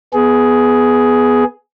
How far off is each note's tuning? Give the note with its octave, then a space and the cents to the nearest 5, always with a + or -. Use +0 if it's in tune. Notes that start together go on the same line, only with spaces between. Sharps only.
B3 +0 G#4 +10